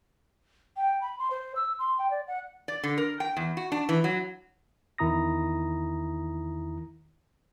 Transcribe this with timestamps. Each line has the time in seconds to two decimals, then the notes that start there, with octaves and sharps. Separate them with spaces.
0.76 G5
1.01 B5
1.19 C6
1.30 C5
1.55 E6
1.79 C6
1.98 G5
2.11 D5
2.27 F#5
2.68 D5
2.83 D3
2.98 A#4
3.20 G5
3.37 E2
3.57 F#4
3.72 D4
3.89 E3
4.04 F#3
4.98 E2 D#3 E4 A#5 D#6 A#6